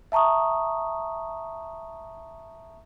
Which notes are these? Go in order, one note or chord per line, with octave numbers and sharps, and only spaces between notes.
E5 A5 A#5 C#6 D#6